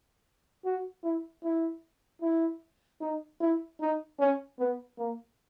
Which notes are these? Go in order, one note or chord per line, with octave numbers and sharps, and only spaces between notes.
F#4
E4
E4
E4
D#4
E4
D#4
C#4
B3
A#3